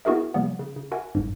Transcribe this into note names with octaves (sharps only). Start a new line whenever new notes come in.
B3 E4 F#4 G#4 A#4 E5
C3 F3 G3 A#3 B3
C#3
C#3
F#4 A#4 E5 F#5 G#5
G1 C2 F2 G#2